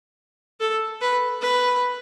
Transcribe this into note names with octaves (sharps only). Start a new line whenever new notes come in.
A4
B4
B4